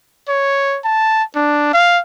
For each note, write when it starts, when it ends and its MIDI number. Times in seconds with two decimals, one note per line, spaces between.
0.28 0.79 73
0.85 1.23 81
1.36 1.73 62
1.74 2.00 77